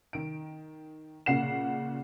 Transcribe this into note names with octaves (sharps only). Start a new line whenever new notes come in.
D#3 D7
A#2 C#3 F#5 C7 E7